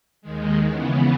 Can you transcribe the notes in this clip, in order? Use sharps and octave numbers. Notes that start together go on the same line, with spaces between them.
D#2 D#3 G#3
C#3 E3 B3